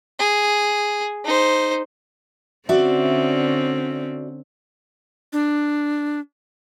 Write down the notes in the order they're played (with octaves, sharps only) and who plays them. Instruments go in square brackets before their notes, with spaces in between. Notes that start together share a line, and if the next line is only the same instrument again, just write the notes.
[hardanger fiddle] G#4
D#4 C5
[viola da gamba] D3 C4 C#4 [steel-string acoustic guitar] F#4 D5 E5
[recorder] D4